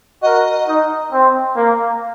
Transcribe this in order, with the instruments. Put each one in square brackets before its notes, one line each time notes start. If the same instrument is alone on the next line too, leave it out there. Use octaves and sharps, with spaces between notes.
[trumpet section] F#4 A#4 [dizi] D#5
[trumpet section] D#4
C4
A#3